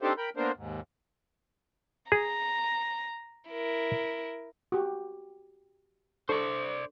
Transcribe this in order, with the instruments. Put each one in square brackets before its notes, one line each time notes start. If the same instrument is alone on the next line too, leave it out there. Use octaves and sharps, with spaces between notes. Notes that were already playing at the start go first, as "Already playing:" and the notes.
[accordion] C4 D4 D#4 G4 A4 C5
A#4 G5 B5
A#3 B3 D4 A#4 C5
D#2 G#2
[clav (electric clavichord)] G#4 [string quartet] A#5
[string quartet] E4 A#4
[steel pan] F#4 G4
[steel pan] D4 A4 C#6 [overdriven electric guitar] C5 D5